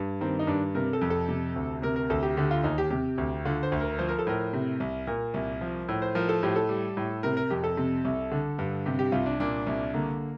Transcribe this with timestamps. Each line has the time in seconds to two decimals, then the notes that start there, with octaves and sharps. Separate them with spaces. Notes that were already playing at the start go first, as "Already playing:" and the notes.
Already playing: G2
0.21 D#3 C4
0.39 D#4
0.47 G2 D4
0.75 C3 A#4
0.93 A4
1.01 F2
1.10 A4
1.29 C3
1.56 D2
1.82 C3 A#4
1.96 A#4
2.10 D2 A4
2.23 G4
2.37 D3 G4
2.51 F4
2.64 D#2 D#4
2.78 G4
2.90 C3 G4
3.18 D2
3.45 D3 F4
3.63 C5
3.72 D2
3.81 A#4
3.99 F3 C5
4.08 A#4
4.19 A4
4.27 A2 A#4
4.53 C3
4.80 C2
5.07 A#2 A#4
5.34 C2
5.61 F3
5.88 A2
6.02 C5
6.15 F3 A#4
6.29 A4
6.43 A2 G4
6.56 A4
6.69 G3
6.97 A2
7.23 C3 A#4
7.37 A#4
7.50 F2 G4
7.64 A4
7.77 C3
8.05 C2
8.32 D3
8.59 G2
8.86 C3 G4
8.99 G4
9.12 C2 F4
9.26 D4
9.40 A#2 D4
9.67 C2
9.94 D3 A#3